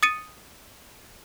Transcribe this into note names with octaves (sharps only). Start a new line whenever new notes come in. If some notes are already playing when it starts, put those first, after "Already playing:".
D#6 A6 C#7 D#7